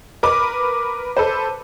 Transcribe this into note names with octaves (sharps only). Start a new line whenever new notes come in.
A#4 B4 D6
A4 B4 C5